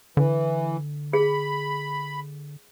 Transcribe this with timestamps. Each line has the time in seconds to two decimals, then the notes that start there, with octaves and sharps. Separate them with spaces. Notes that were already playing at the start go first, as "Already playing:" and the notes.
0.17 D3 E3
1.13 G#4 B5